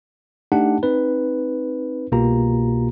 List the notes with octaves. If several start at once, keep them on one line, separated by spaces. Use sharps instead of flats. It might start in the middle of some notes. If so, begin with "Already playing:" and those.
A3 D4 D#4 G4 F#5 A5
C4 D#4 B4
C2 B2 A#3 F4 G4 A#5